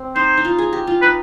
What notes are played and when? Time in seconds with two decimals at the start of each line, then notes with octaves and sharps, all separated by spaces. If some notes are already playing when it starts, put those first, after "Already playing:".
Already playing: C4
0.15 D#4 C5
0.37 D#4
0.45 F4
0.58 G#4
0.73 G4
0.87 F4
1.02 D#4 B4